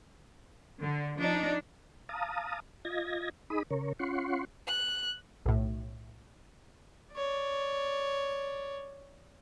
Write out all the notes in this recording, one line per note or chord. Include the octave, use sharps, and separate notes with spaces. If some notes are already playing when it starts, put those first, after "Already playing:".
D3
F3 D4 D#4
F5 A5 A#5 D#6
F4 D#5 G#6 A#6
D#4 G#4 B5 D#6
C#3 A#4 C#5
C#4 F4 F#5 C6 C#6
F#6
B1 A2
C#5 D5